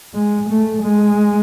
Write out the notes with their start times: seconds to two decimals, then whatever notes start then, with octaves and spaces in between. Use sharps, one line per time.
0.15 G#3
0.49 A3
0.83 G#3